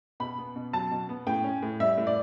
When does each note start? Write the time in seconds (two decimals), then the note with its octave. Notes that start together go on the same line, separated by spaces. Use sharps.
0.20 B2 B5
0.38 B3
0.56 B2
0.73 F#3 A5
0.91 B2
1.09 B3
1.27 A2 G5
1.44 C#4
1.62 A2
1.80 G3 E5
1.98 A2
2.07 D5